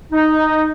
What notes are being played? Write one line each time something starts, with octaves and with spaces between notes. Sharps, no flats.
D#4